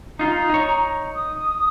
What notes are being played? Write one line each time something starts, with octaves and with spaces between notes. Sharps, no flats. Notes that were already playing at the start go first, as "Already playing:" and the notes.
D#4 F4 A#5
D#4 C#5
D#6